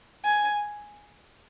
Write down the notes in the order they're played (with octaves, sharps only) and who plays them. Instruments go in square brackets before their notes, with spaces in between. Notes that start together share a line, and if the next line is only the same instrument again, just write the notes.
[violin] G#5